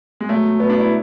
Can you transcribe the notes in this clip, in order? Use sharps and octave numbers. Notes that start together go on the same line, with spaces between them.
G#3
B2 F#3 A3
B2 F#3 B3
D4
E4